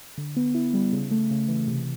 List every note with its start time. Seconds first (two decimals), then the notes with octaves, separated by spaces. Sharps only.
0.18 D3
0.36 B3
0.54 E4
0.74 G3
0.93 C#3
1.11 A3
1.31 C#3
1.48 E3
1.68 C3